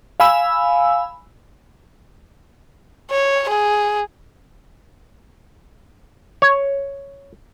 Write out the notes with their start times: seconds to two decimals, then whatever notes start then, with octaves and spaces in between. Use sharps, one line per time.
0.20 F5 G#5 B5 E6
3.11 C#5
3.49 G#4
6.42 C#5